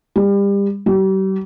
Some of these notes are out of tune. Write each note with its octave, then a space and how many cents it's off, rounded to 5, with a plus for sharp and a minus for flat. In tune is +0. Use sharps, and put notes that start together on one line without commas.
G3 +30
G3 -40